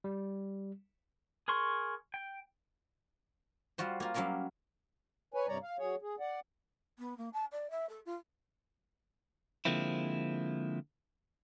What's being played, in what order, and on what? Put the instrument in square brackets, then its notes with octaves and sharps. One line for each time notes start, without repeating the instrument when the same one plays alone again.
[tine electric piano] G3
[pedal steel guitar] G#4 A#4 C6 C#6
G5
[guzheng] G3 F4 F#4 C5
A#3 F4
F#3 G3 C#4 A#4 F5
[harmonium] B4 C#5 G#5
G2 C3 G3 C#5 D5 A#5
F5
F#3 G#4 C#5
G#4
D5 F#5
[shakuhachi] B3
A#3
A5
D5
E5
A4
F4
[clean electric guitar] D3 F3 G#3 A#3 C4 E4